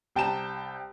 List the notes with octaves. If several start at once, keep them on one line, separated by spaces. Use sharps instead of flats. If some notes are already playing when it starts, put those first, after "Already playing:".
C2 G5 A5 A#5 E7